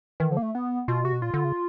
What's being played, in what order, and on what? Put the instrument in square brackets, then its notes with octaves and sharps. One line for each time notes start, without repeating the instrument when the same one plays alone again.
[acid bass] D#3 [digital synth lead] E3
[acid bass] D3 [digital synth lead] F3
[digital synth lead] A#3
A3
B3
[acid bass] B2 [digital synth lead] F4
[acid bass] C3 [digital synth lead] F#4
[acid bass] B2
[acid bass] A#2 [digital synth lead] F4
[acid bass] D3
C#3